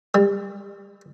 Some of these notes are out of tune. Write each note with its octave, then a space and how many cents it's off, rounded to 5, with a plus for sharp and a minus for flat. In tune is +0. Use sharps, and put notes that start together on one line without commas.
G3 +35